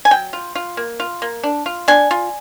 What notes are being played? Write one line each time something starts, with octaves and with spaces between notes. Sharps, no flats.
G#5
F#3 G5
F4
F4
A#3
F4
A#3
D4
F4
D4 G#5
F4